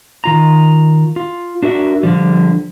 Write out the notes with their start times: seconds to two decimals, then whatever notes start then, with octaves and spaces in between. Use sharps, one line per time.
0.24 D#3 F4 A#5
1.16 F4
1.63 D4 F#4 A#4 E5
2.03 D3 F3 G3